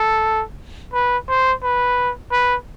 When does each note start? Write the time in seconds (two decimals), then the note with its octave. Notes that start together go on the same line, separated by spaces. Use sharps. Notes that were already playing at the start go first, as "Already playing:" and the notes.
Already playing: A4
0.93 B4
1.29 C5
1.63 B4
2.31 B4